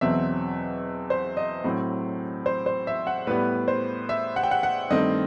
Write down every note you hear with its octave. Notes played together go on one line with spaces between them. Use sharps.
E2 B2 F#3 C4 E5
C5
D#5
A2 F#3 C4
C5
C5
E5
F#5
A2 G3 B3 B4
C5
E5
F#5
G5
F#5
F#5
G2 D#3 A3 C4 D#5